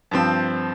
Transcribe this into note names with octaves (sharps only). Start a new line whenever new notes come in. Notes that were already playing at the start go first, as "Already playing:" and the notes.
G2 F3 C4